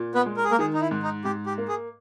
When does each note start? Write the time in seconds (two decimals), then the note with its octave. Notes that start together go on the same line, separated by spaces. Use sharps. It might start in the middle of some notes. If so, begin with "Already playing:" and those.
Already playing: A#2
0.15 B3 B4
0.26 G#3
0.37 A#4
0.44 G#4
0.51 A#3 A#4
0.59 D#3 G#4
0.74 D#4
0.81 E4
0.91 G#2
1.03 D#4
1.25 G#2 G4
1.46 G4
1.58 A#3
1.68 G#4